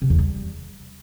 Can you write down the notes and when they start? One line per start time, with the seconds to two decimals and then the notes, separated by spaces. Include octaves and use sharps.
0.02 C3
0.10 E2
0.18 G3